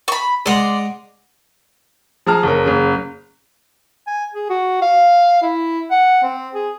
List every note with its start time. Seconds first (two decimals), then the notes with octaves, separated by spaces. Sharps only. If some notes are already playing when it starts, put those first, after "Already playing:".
0.08 B5 C#6
0.46 G#3 D5 F#5 A#5 C6
2.26 F3 G#4 A5 A#5 F6
2.43 F#1 C#4 A#4
2.65 F#1 C#3
4.07 G#5
4.34 G#4
4.50 F#4
4.82 F5
5.42 E4
5.91 F#5
6.23 C4
6.54 G#4